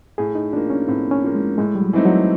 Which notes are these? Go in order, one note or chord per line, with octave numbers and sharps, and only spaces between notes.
A2 G#4
D#4
F3 A#3 D4
C#4
A2 C4
C#4
F3 A#3
G#3
A2 G#3
G3
F#3
E3 A3 C4 D#4
F#3